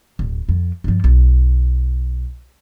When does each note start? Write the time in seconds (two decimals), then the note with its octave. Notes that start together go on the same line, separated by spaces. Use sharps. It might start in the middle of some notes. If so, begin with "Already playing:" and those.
0.19 D1
0.49 F2
0.84 G2 F3
1.04 B1